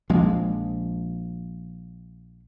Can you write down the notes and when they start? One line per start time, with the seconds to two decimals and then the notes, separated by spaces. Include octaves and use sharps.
0.09 A#1 F3 G#3